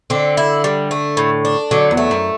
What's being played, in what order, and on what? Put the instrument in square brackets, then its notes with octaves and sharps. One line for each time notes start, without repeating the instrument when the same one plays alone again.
[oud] D3 [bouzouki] C4
[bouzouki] E4
G3
A3
A2
D4
[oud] D3 [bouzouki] F#3
[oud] E2
[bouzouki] A3
[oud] F#2